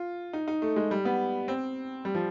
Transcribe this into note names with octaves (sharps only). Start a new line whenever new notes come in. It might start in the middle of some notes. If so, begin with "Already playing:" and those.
Already playing: F4
D#4
D#4
A3
G#3
G3
B3
C4
G3
F3